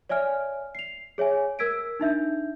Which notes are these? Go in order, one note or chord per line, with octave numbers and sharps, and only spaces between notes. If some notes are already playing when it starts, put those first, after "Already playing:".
C#5 D5 E5 G#5 F6
C7 F7
G#4 C#5 E5 G#5
A#4 E6 G#6 B6 D7
D4 D#4 E5 G6